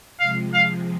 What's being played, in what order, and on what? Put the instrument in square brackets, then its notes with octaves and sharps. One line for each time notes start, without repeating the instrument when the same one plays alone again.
[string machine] C3 F3 G#3 [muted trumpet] F5
[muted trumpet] F5